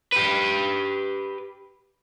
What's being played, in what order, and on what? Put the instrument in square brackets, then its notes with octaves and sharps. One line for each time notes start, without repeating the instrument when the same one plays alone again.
[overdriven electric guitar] G4 B4